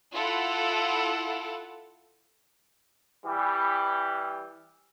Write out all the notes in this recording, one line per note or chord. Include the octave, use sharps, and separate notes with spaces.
E4 F4 A4 F#5
E3 G3 G4